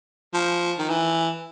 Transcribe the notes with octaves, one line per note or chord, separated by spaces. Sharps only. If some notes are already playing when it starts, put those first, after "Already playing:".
F3
D#3
E3